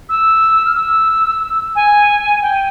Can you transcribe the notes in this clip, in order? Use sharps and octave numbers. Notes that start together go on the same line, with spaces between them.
E6
F6
E6
G#5
G5